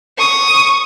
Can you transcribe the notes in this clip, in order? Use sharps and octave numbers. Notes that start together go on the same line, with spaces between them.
C#6 D#6